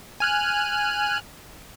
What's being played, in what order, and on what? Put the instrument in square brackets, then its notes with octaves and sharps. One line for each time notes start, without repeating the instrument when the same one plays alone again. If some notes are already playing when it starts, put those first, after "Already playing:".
[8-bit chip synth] G#5 F6 F#6